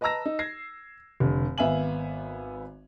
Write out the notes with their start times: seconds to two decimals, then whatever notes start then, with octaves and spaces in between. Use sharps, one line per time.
0.01 B4 D#5 A5 A#5 E6 A#6
0.26 D#4
0.39 G#6 A#6 C7
1.20 F1 D3
1.58 G#1 B3 E5 F5 G#5 F#7